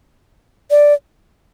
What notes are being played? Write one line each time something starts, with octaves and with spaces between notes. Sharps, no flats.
D5